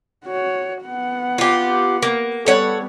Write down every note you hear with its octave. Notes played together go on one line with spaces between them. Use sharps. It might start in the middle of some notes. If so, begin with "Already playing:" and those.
F#4 C#5
B3 F#5
F4 G4
A#3
G3 B3 A4 C#5 F#5